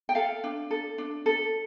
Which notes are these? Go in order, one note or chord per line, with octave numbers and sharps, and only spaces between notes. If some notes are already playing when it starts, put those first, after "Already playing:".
G5
A4 F5
D4
A4
D4
A4